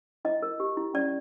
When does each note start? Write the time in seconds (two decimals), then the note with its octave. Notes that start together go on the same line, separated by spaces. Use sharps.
0.25 E4 D#5
0.42 A#4
0.60 G4
0.77 E4
0.94 C#4 D5